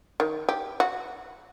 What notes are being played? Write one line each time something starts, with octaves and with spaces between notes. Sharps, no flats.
D#3
G4
F#4